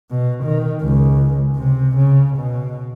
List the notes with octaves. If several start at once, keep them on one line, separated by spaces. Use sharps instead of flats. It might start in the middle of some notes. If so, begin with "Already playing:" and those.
B2
D#3
C#2
C3
C#3
B2